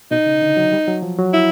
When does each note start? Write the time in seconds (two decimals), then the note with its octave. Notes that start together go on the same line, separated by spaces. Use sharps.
0.11 B2 D#4
0.26 C#3
0.42 D3
0.57 F#3
0.73 G3
0.88 F#3
1.02 F3
1.18 F#3
1.33 E4